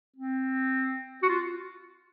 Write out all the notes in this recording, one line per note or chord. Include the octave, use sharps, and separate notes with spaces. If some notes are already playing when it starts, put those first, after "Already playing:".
C4
F#4
F4